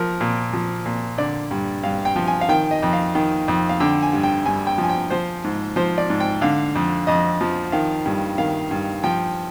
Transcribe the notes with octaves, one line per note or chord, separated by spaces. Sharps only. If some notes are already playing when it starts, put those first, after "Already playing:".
Already playing: F3 A#4
A#2
F3
A#2
D3 D5
G2
G2 F5
G5
F3
G#5
F5
D#3 G5
D#5
F2
F5
D#3
F2
F5
D3 G5
G#5
G2
G5
G2 G#5
G5
F3
G#5
G5
F3 C5
G#2
F3 C5
D5
G#2
G5
D3 F5
F2
F2 D#5
F3
D#3 F5
G2
D#3 F5
G2
F3 G5